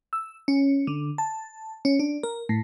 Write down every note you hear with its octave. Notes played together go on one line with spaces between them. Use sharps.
E6
C#4
D3
A5
C#4
D4
A#4
A2